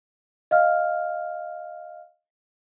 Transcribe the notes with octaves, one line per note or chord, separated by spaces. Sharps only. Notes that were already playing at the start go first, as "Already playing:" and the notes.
D#5 F5 F6